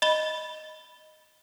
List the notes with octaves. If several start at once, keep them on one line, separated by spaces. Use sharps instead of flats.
D#5 B5 G7